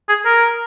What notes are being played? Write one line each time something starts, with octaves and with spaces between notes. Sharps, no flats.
G#4
A#4